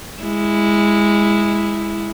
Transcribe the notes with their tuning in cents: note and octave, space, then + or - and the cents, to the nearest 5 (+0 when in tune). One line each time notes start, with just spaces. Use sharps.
G#3 -10 E4 +0